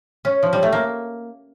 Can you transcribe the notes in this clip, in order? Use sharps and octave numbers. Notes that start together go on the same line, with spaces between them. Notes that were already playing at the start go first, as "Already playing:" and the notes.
C#4
F3
G3
A3
A#3